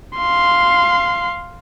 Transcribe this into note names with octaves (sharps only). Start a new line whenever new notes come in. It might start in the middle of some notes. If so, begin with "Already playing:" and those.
F5 C6